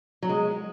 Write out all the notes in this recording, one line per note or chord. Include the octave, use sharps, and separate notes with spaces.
F#3
G#3